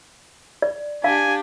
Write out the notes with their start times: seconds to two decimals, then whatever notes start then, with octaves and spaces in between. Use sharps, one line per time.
0.62 D5
1.04 D4 G4 F5 G#5